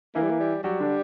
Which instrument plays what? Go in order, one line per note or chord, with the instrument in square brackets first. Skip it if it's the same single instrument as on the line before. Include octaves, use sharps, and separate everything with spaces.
[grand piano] E3 E4 [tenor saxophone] A#3
[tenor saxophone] G3
A#3
G3
[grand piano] F#3 F#4 [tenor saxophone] G3
[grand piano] D3 D4